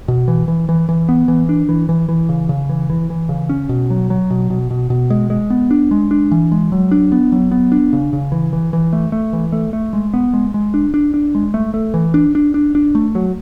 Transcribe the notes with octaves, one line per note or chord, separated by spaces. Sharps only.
B2
E3
E3
E3
E3
B3
E3
D4
E3
E3
E3
C#3
C#3
E3
E3
E3
C#3
C#4
B2
F#3
F#3
B2
B2
B2
B2
G#3
G#3
B3
D4
G#3
D4
E3
G#3
F#3
D4
B3
F#3
B3
D4
C#3
C#3
E3
E3
E3
A3
A3
E3
A3
A3
G#3
B3
G#3
G#3
D4
D4
D4
G#3
A3
A3
E3
D4
D4
D4
D4
A3
F#3